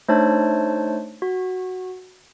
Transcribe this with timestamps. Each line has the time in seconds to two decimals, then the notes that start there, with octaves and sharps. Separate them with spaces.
0.08 A3 D4 D#4 C5 C#5 A5
1.22 F#4